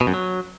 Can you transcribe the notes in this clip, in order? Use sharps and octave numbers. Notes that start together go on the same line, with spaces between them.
B2
F#2
F#3